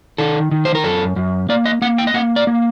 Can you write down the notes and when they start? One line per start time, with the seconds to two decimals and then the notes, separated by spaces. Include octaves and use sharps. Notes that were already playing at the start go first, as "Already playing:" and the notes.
0.18 D#3 A4
0.51 D#3
0.65 C5
0.75 A#4
0.84 F#2 A4
1.16 F#2
1.49 A#3 D5
1.66 D#5
1.82 A#3 F#5
1.98 G5
2.07 D#5
2.14 A#3 F#5
2.36 D5
2.47 A#3